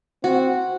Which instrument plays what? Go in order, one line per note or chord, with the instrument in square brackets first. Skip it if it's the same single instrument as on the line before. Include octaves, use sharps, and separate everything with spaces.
[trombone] C4 [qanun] F#4